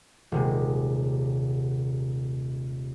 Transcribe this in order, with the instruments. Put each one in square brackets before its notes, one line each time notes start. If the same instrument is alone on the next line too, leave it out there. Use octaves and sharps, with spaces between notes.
[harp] D#1 C3 G#3